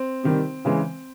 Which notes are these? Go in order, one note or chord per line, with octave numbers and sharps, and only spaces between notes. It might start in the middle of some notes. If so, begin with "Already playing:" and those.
Already playing: C4
C3 D#3 G3
C#3 E3 G#3